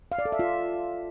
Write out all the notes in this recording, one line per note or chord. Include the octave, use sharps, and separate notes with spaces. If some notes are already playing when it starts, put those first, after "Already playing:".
F5
D5
A4
E5
F4